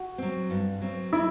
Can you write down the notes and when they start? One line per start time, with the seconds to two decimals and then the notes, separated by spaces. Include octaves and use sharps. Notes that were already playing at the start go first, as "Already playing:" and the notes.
Already playing: F#4
0.18 F#3 C4
0.50 G2
0.82 F#3 C4
1.13 F#3 E4